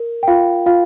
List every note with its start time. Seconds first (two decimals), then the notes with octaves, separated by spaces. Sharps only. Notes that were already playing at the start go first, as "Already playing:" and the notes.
Already playing: A#4
0.23 G5
0.28 F4 F5
0.66 F4 F5